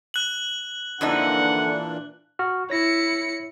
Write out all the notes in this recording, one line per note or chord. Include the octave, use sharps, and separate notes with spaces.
F#6 F#7
F2 A#2 D3 E3 D4 D#4 F#5
F#4 F6
E4 C#5 A#6 C#7